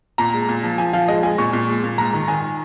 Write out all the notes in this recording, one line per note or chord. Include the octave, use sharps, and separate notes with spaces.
A#2 A#5
G#3
A#2
F3
F3 G#5
F3 F5
G#3 D#5
G#3 G#5
A#2 C#6
A#2
G#3
A#2
G#2 A#5
D#3
D#3 G#5